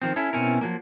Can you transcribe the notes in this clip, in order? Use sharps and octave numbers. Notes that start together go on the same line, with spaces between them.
D#3 F3 C4
C#4 E4 A4
B2 C4 C#4 E4 A#4
F3 F#3 A#3